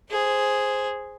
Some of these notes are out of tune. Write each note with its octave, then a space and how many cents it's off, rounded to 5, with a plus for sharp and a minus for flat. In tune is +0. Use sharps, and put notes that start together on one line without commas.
G#4 +0 C5 +0